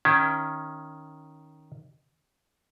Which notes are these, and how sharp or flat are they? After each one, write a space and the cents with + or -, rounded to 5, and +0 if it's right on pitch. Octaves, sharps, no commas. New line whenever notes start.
D#3 +0 C#4 +0 E4 +30